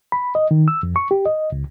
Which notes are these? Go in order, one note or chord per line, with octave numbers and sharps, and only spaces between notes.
B5
D#5
D#3
E6
F2
C#6
G4
D#5
C#2